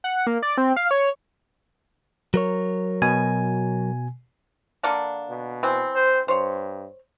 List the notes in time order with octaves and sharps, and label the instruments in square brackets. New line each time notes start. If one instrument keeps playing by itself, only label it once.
[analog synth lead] F#5
A#3
D5
C4
F5
C#5
[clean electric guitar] F#3 A#4 C#5
[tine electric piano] B2 G#5
[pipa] D3 A#3 D4
[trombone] B2
[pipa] E3 C4
[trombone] C5
[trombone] G2 [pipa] C5 C#5